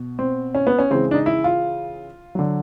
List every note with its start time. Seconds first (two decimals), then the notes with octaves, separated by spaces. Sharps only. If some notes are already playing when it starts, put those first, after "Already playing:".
Already playing: B2
0.19 C4
0.55 C#4
0.67 B3
0.78 C#4
0.90 C#3 E3 G#3 C4
1.11 D4
1.14 D#4
1.26 E4
1.44 F4
2.35 D3 F#3